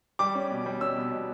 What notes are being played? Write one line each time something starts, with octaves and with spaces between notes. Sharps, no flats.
G3 D6
C#4
B2
G3
C#4 E6
B2
B2